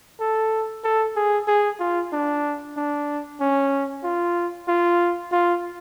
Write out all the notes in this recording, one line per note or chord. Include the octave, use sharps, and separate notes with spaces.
A4
A4
G#4
G#4
F4
D4
D4
C#4
F4
F4
F4